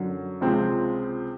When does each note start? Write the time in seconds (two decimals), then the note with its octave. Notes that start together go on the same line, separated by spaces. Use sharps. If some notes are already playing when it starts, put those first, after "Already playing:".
Already playing: F#2 D3 F#3
0.41 C#2 C3 F3 G#3 C4